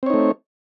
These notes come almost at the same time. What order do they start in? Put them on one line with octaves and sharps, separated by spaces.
C4 C#5 D#4 A3